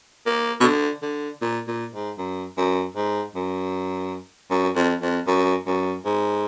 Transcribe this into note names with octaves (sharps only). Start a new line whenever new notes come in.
A#3
B2
D3
D3
A#2
A#2
G#2
F#2
F#2
G#2
F#2
F#2
F2
F2
F#2
F#2
G#2